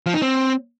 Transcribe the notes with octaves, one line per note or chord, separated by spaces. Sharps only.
F3
D#4
C4